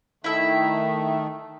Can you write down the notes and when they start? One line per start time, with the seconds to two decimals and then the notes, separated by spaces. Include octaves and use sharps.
0.24 D#3 A3 E4 E5